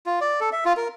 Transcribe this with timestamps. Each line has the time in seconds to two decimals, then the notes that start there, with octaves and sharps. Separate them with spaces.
0.06 F4
0.21 D5
0.40 A4
0.53 E5
0.65 F4
0.77 A#4